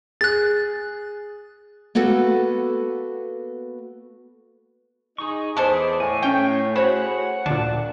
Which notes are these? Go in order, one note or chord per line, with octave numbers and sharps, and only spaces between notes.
G#4 F#6 A6
A#3 B3 F#4 A4 B4
D#4 G#4 C#6
E2 G#3 B3 G#4 A4 C5 D5
A2 C#5 G#5
A3 C#4 G5 G6
F#4 G#4 C5 C#5 F#5 B5
D2 A#2 D4 A5